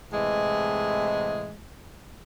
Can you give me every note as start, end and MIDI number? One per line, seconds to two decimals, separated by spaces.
0.12 1.56 45
0.12 1.56 48
0.12 1.56 52
0.12 1.56 56